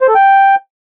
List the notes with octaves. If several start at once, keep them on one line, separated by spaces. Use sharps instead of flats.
C5
A4
G5